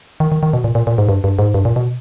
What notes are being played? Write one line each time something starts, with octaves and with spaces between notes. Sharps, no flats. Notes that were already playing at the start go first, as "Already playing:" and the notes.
D#3
D#3
D#3
B2
A#2
A#2
A#2
G#2
G2
G2
G#2
G2
A#2
B2